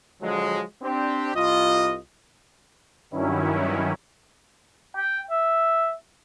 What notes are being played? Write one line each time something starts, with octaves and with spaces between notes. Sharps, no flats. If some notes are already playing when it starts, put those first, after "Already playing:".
D3 F3 F#3 G#3
C4 D4 G4
C2 F4 D#5
G2 D#3 F#3 C#4 E4
G5
E5